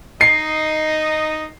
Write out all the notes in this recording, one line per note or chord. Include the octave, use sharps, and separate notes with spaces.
D#4 D#5 C7